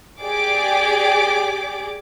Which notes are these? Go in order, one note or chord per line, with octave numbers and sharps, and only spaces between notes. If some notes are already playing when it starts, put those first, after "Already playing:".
G4 G#4 D5 D6